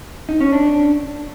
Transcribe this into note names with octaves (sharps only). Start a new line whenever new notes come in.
D#4
C#4
D4